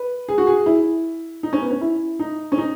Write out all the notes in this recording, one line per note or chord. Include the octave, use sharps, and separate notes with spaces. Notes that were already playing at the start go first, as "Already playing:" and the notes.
Already playing: B4
G#4
F#4
G#4
E4
D#4
C#4
B3
C#4
E4
D#4
C#4
D#4